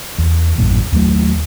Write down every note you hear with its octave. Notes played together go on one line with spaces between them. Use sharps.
E2
A1 F#2 A#2
D#2 F#3 G#3 A3